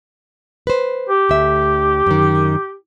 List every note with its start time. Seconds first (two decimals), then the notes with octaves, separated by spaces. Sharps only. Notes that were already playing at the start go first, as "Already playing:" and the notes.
0.67 B4 C5
1.09 G4
1.29 D2 E5
2.06 F#2 D#3